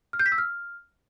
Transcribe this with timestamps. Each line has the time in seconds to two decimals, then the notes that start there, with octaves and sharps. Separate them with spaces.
0.13 F6
0.19 G6
0.26 B6
0.32 E6
0.38 F6